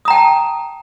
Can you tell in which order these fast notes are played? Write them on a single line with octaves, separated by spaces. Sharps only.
D#6 A#5 G5 A5